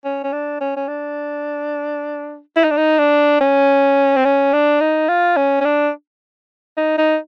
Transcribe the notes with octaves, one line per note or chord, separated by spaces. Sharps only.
C#4
C#4
D4
C#4
C#4
D4
E4
D#4
D4
D#4
D4
C#4
C4
C#4
D4
D#4
F4
C#4
C#4
D4
D#4
D#4